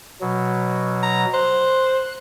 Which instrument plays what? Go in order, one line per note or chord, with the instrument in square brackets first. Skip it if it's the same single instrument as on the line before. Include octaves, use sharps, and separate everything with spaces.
[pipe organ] B2 F#3
[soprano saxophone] A#5
[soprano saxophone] C5 [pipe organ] F#6